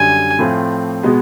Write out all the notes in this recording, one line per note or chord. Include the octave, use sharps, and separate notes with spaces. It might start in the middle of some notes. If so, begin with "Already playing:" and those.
Already playing: F#2 D3 G3 G#5
A2 F3 A3 C4 F4
B2 G#3 B3